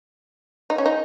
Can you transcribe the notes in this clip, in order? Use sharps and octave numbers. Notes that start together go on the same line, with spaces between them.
D#4
C#4
D#4